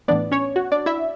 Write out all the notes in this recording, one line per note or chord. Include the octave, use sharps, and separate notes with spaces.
A2 E3 B3 D4 D5
C#4 C#5
F#4
D4 D5
E4 E5